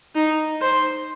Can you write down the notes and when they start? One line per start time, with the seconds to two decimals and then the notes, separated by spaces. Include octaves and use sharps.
0.15 D#4
0.62 C5